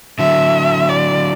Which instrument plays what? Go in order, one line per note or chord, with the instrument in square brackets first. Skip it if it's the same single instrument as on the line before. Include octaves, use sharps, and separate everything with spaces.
[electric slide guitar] D3 F#3 [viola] E5
[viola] D5